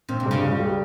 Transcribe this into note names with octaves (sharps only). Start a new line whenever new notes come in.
A#2 C4
C3
G2
C#3
C#2
G3